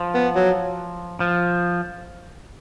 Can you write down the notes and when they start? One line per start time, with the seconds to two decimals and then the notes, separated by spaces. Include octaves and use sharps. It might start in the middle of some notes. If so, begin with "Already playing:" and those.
Already playing: F3
0.14 B3
0.35 F#3
1.20 F3